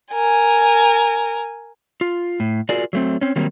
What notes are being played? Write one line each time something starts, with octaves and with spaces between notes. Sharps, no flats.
A#4 G#5
F4
A2
F4 F#4 G#4 A#4 D5
F#3 A3 C4
C4 C#4
D#3 F#3 G3 A#3 C4